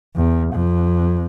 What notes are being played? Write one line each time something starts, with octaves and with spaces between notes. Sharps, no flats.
E2
F2